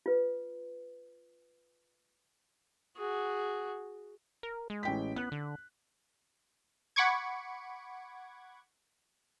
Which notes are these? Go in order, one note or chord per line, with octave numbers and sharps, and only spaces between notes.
F4 B4
F#4 G#4
A#4
G#3
A1 G5 B6
B3 F#6
D3
F#5 B5 C#6 D6 G#6